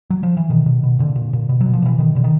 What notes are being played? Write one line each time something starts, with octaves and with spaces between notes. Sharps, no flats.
F#3
F3
E3
B2 D#3
B2
B2
A#2 D3
A#2
A#2
B2
F#3
B2
F3
B2 E3
B2 D#3
B2 D3
D#3